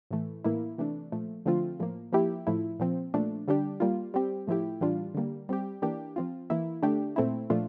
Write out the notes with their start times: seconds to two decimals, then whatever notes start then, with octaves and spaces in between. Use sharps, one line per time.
0.11 A2 E3 A3
0.44 A2 E3 A#3 E4
0.78 C3 E3 A3 D4
1.12 A#2 F3 A3
1.46 D3 F3 A3 C4 F4
1.79 A2 F3 A#3
2.12 F3 A#3 E4 G4
2.47 A2 F3 A3 E4
2.79 A#2 F3 C4
3.14 A#2 F3 A3 D4
3.48 D3 G3 D4 G4
3.80 G3 A#3 F4
4.14 G3 C4 G4
4.47 A2 F3 A3 E4 G4
4.81 A2 E3 G3 D4 F4
5.14 D3 G3 A#3
5.49 G3 C4 G4
5.82 E3 A#3 D4 G4
6.16 F3 C4 F4
6.50 E3 A#3 E4
6.83 D3 A3 D4 G4
7.16 A#2 A3 C4 E4
7.50 A#2 F3 A3 D4 F4